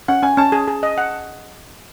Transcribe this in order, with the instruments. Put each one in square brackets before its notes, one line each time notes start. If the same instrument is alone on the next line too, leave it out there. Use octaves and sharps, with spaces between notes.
[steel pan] C#4 [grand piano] F#5
[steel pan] C#4 [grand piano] G#5
[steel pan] C#4 [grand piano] A5
[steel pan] G#4
G#4
D#5
F#5